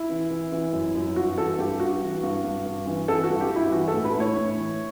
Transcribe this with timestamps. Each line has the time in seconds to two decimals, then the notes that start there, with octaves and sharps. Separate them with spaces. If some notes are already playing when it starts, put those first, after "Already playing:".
Already playing: E4
0.09 E3
0.30 E3
0.52 E3
0.73 F#2
0.95 F#2
1.16 G2 F#4
1.37 E3 A4
1.59 G2 G4
1.80 G2 F#4
2.02 E3
2.23 G2
2.44 G2
2.66 G2
2.86 E3
3.08 E3 A4
3.24 F#4
3.30 G2
3.40 G4
3.51 G2 E4
3.72 E3 F#4
3.88 A4
3.94 A2
4.05 B4
4.15 A2
4.20 C#5
4.36 A2
4.58 E3